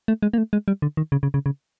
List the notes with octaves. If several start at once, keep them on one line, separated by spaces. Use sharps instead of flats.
A3
G#3
A#3
A3
G#3
G3
D3
D#3
C#3
C#3
C#3
C#3